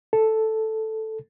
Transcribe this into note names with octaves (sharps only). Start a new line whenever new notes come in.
A4